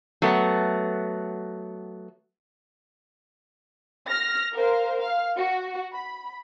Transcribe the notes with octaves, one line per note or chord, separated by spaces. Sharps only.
F#3 A3 B3
F6 A#6
A#4 C5 F5
F5
F#4
B5